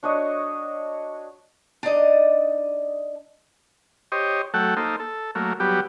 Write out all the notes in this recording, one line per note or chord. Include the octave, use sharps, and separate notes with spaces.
D4 F#4 C#5 D#5
D4 D#4 D5 D#5
G4 C5 C#5 D#5
F#3 A3 A4 F#5 G5
A#3 D#4 A4 C5
A4
F#3 A3 A#3
F#3 G3 B3 G4